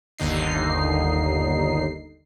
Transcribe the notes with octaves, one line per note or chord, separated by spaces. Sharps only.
G1 D#2 D3 D#4 C7